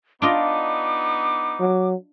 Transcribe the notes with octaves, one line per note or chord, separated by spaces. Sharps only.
B3 D4 D#4 F4 D#5 D6
F#3